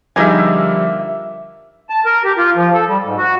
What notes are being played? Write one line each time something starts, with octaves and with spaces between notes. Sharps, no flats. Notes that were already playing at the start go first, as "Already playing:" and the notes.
D3 F3 G3 A#3 D#4 G#4 E5 G#5
A5
A#4
G4
F4
F3
A4
G3
G#2
F#4